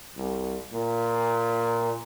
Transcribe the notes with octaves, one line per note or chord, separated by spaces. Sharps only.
C2
A#2